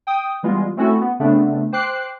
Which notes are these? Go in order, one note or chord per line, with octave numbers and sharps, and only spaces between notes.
G5 D#6
E3 G3 G#3 B3 F4
A3 C4 C#4 E4 F#4 A4
B3
C#3 A3 B3 C4 D4
C5 G5 D6 F#6 C7